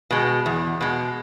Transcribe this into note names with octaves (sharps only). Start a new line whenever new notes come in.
B2 G#3
E2
B2 G#3